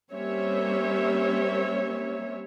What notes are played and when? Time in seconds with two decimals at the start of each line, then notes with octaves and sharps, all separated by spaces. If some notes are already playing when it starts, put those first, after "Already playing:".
0.11 G3 A#3 C4 C#4 C#5 E5